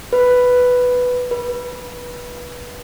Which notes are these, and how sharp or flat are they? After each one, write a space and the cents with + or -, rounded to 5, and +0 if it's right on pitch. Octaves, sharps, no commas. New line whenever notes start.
B4 +5
B4 -20